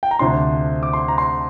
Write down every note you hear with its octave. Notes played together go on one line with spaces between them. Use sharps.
G5
A#5
D2 C3 F3 D4 C6
D6
C6
A#5
C6